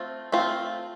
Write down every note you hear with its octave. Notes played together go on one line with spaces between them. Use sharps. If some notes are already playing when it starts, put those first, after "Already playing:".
Already playing: A3 C4 F4
A3 C4 F4